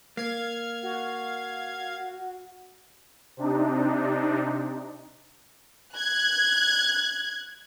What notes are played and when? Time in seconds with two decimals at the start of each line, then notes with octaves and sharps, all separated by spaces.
0.17 A#3 F5 G#6
0.83 F#4
3.37 C3 D4 D#4
5.95 F#6 G#6